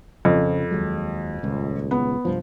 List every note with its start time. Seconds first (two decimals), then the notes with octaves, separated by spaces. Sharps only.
0.25 F2 C#3 F3
0.71 D#2 F#3 G#3
1.43 D#1 C#2
1.91 B3
2.25 C2 G2 F3